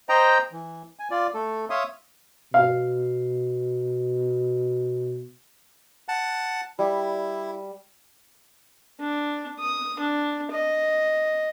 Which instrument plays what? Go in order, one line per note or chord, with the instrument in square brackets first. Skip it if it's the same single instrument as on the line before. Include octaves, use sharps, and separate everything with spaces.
[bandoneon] C5 D#5 G5 A#5
E3
G#5
F4 D5
A3 A4
C#5 E5 F5 C6 D#6
[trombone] B2 [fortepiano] F5
[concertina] F#5 A5
[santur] G3 [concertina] E4
[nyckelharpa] D4
D#6
D4
D#5